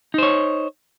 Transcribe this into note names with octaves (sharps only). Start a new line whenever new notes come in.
D#4 C5 C#5